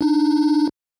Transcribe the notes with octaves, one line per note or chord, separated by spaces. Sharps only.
D4 D#4